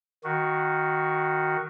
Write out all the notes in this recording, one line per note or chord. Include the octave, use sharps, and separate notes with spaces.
D#3 F#4